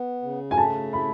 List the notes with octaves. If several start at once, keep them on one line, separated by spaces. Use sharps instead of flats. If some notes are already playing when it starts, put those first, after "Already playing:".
Already playing: B3
C#3
G#5
A3 A5
E4 B5